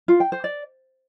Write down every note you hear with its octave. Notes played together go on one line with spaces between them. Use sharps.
F4
G5
C5
D5